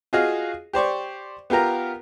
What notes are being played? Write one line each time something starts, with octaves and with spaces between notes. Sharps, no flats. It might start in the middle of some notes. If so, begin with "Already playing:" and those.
F4 F#4 G#4 D#5 F5
G4 C5 D5 C#6
B3 F4 G4 A#4 A#5